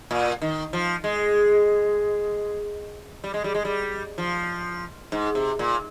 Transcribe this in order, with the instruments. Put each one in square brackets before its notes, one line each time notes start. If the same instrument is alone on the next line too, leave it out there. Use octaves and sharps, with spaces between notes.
[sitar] A#2
D#3
F3
G#3
G3
G#3
G3
G#3
G3
F3
G#2
C3
A#2